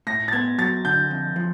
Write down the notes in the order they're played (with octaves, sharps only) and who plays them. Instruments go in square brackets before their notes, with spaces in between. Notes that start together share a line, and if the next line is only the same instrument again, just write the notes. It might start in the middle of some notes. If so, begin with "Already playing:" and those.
[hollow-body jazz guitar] A2 [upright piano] A#6
[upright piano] A6
[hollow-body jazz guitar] B3 [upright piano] G#6
[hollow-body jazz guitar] F#3 [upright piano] A6
[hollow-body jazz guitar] D3 [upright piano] G6
[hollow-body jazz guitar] F2
F3